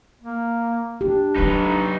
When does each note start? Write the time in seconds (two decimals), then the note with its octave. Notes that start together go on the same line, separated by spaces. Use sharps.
0.21 A#3
1.01 D4 G4
1.36 G2 F#3 D#4 B4